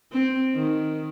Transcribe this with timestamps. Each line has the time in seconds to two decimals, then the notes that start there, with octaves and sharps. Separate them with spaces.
0.12 C4
0.55 D#3